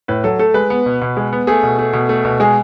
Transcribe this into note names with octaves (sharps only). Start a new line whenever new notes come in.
A2 B4
F#3 A4
A3 A4
G#3 B4
B3
B2
B2
G#3
B3
A3 G#4
B2
A3
B2
A3
B2
G#3 G#4